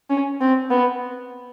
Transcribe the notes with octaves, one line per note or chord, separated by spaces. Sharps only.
C#4
C4
B3